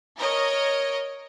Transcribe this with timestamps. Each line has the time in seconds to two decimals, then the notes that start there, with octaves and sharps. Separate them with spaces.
0.18 A#4 C#5 D#5